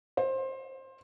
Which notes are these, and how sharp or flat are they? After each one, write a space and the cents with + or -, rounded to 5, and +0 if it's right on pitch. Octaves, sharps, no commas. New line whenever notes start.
C5 +20